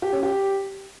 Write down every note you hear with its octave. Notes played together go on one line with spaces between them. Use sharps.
G4
C#4
G4